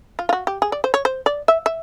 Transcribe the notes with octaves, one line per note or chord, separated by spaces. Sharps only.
F4
F4
F#4
G4
G#4
D5
C5
C#5
C5
D5
E5
E5